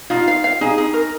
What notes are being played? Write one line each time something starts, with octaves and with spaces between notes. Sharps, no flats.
D#4 F4
F5
F5
D#4 G#4
D#4
A#4